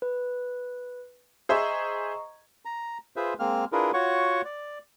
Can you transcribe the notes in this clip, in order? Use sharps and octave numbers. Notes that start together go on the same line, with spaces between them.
B4
G#4 C5 D#5 E5 A#5 C#6
A#5
F4 G#4 B4 C5 E5
G#3 A#3 C4 F6
D4 E4 F4 G#4 A#4 B4
F4 F#4 C#5 F#5 C#6
D5